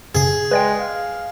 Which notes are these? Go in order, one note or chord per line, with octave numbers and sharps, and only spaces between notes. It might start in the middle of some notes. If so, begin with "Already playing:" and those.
F#2 C#3 G#4
G#3 B4 D5 G5
F5